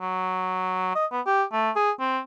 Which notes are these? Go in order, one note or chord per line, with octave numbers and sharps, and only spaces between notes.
F#3
D#5
B3
G4
A3
G#4
C4